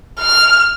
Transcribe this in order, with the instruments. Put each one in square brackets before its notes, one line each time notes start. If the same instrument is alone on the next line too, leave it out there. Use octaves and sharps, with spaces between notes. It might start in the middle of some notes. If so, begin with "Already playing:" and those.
[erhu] F6